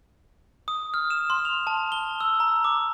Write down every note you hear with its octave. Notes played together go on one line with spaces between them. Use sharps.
D#6
F6
E7
C6
F7
A5
G7
E6
A#5
D6